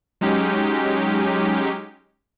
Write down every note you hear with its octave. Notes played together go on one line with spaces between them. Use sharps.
F#3 G#3 C#4 D#4 G4